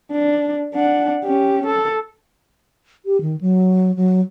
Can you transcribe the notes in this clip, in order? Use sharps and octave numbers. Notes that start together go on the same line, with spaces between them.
D4
D4 F#5
C#4 G4
A4
G4
D#3
F#3
F#3